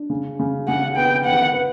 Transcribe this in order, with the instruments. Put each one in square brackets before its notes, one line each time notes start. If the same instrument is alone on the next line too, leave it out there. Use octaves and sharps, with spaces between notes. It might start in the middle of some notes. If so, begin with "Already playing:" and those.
Already playing: [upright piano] D4
C#3
C#3
[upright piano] C#3 [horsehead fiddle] F#5
[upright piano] B3 [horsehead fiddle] G5
[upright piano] B3 [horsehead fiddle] F#5
[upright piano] B4